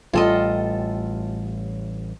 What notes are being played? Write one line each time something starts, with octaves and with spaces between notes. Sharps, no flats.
A1 A2 G3 F4 A4 D#5